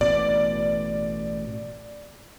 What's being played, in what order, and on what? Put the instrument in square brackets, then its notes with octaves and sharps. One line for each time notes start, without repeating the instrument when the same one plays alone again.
[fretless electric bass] A1 B2 [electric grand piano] D5